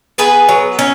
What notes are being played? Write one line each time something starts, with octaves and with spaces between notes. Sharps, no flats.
B3 G#4 B4
F#3
C#4